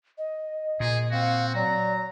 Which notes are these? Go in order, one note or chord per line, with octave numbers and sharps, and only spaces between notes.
D#5
A#2 G#4
C4 F#4 F5
F#3 D5 A#5